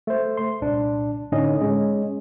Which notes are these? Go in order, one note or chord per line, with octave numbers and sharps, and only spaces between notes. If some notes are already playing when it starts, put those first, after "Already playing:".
A3 C5
C6
C2 A#2 D4
A2 D3 C#4 D#4 D#5
G#3 C#4